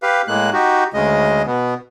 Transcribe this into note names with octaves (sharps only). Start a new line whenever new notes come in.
G4 B4 F5
A2 G#3 A#3 F#6
D#4 F#4 G4
D2 C#3 G#3 D#5
B2 B3